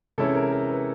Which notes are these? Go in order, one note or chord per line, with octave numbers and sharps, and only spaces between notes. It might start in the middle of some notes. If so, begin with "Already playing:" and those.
C3 E3 G#3 C#4 E4 A4
A#4
A#4
B4